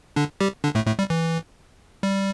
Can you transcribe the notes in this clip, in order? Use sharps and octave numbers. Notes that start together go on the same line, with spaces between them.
D3 D4
G3 G4
D3 D4
A2 A3
A2 A3
G3
E3
G3